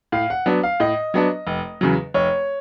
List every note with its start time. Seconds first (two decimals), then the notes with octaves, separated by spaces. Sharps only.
0.12 A2 F5
0.30 F#5
0.46 F#3 B3 D4
0.63 F5
0.80 A2 D#5
1.14 F#3 B3 D4
1.47 F1
1.81 E2 C#3 F#3
2.14 F1 C#5